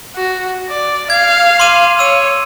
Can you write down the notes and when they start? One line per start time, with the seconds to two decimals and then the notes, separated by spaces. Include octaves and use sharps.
0.16 F#4
0.69 D5
1.10 F5 G#6
1.60 C6 D6 D#7
1.99 C#5 E6 D#7